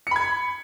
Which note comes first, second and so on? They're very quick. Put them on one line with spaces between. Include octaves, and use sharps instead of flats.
C#7 B5 G#6